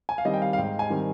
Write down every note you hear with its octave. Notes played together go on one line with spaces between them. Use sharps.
G#5
F5
D#3 G3 C4 D#5
G5
F5
F5
G#2 G5
G#5
D#3 G3 C4